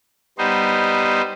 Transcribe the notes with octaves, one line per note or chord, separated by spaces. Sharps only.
G3 B3 D#4 C5